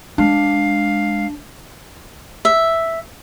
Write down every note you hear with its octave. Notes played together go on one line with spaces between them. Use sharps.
G#3 D4 F5
E5